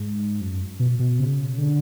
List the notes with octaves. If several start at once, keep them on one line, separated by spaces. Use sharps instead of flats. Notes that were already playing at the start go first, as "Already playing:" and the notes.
Already playing: G#2
F#2
B2
B2
C#3
D3